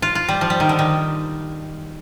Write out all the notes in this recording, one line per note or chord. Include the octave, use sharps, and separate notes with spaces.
F4
F4
G3
F3
G3
D#3
D3
D#3